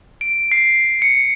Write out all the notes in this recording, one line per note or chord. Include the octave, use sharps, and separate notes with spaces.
D7
C7
C#7